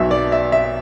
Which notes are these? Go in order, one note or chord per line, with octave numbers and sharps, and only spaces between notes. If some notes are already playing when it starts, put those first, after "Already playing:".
Already playing: B1 B2 E5
D5
E5
E5